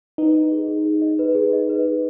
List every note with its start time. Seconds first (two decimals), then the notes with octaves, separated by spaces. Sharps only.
0.18 D#4 B4
0.35 D#5
0.51 G#4
0.68 G#4
0.85 G#4
1.02 D#5
1.19 B4
1.35 G#4
1.53 D#5
1.69 B4
1.85 G#4